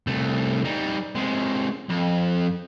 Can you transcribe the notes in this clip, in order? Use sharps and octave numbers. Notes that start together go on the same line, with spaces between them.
C2 A3
G3 D#4
C3 G#3
F2